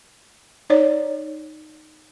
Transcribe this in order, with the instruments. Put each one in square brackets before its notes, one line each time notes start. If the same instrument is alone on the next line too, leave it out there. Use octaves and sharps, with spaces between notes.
[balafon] D#4 C#5 D5